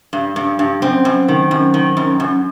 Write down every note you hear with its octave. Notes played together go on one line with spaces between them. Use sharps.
G2
G2
G2
F#2 C4
F#2
D#3
F#2
D#3
F#2
F#2